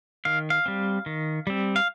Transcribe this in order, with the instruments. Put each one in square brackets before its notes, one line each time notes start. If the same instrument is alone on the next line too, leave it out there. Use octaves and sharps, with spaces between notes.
[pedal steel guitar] D#3 F5
F5
G3 C4
D#3
G3 C4
F5